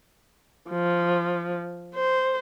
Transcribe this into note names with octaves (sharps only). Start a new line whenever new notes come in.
F3
C5